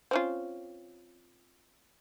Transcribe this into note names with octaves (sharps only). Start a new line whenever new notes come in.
C4 C#4 F4